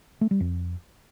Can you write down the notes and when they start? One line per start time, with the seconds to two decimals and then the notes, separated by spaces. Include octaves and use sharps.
0.21 A3
0.31 G3
0.40 F2